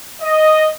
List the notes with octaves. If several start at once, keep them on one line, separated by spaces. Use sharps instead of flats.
D#5